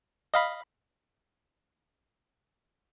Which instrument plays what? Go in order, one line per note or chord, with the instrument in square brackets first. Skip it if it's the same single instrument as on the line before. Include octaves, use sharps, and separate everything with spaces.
[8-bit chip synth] D#5 F5 B5